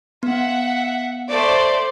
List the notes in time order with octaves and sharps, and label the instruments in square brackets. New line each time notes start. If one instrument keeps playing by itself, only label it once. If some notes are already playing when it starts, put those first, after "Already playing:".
[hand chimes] B3 [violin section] E5 F#5
[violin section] A3 C5 D5